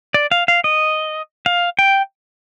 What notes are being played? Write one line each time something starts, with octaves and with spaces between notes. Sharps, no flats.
D5
F5
F5
D#5
F5
G5